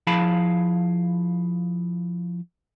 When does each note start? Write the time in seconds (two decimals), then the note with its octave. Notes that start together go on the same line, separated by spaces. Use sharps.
0.07 F3 E4 G#4 F5 A5 B5